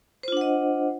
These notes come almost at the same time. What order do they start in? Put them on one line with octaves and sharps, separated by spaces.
C5 F4 D4 F#5 D#5